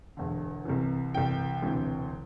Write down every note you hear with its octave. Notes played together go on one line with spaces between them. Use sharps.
E1 E2 D3
C2 C3 E3
C2 C3 E3 G5
E1 D2 C3 E3